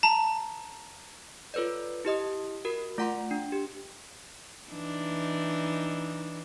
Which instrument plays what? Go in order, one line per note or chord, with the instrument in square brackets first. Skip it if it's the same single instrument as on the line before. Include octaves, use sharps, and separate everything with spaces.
[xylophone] A5 A#5
[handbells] F4 A4 B4 C#5 D5
E4 G4 D#5 D#6
F#4 A#4
A3 F4 F#5 A#5 C6
D4
G4
[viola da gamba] E3 D4 D#4